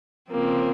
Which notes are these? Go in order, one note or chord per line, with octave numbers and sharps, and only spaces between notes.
C#3 F3 A#3 C4